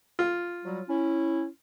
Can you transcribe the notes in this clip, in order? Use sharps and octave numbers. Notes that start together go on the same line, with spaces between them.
F4
F#3 G3
C#4 E4